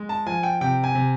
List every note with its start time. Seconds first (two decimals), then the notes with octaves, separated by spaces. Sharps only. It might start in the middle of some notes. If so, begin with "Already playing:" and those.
Already playing: G#3
0.09 A5
0.27 F3 G#5
0.43 G5
0.61 C3 G5
0.84 G#5
0.95 C3